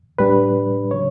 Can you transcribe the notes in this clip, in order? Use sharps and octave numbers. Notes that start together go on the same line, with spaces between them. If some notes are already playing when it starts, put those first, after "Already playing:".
A2 G3 D4 B4
C#3 F#3 C#5